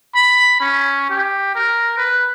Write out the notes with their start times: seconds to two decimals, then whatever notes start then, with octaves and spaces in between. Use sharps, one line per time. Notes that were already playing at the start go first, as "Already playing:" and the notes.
0.15 B5
0.60 C#4
1.10 G4
1.55 A#4
1.97 B4